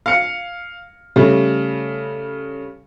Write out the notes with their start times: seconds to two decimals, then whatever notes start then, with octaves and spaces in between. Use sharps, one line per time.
0.06 F5 C#7
1.16 C#3 G3 A3